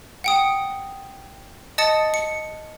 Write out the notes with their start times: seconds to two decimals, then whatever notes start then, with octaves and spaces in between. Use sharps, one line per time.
0.24 F#5 G5 D#6
1.78 D#5 A5 D#6 A6 C#7
2.14 C#7